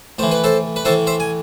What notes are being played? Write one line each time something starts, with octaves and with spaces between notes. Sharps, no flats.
A2 E3 C5
B4
A4 C5
B4
A2 E3 A4 C5
C5 E5
G#5